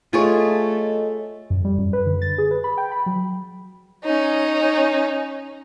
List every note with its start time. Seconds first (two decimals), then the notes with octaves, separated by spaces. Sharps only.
0.13 A3 F4 G#4 A4 C#5 D#5
1.50 F#2
1.65 G3
1.79 F#2
1.93 B4
2.06 D3
2.22 A6
2.38 G#4
2.51 B4
2.64 B5
2.78 G5
2.92 B5
3.06 F#3
4.04 C#4 D#4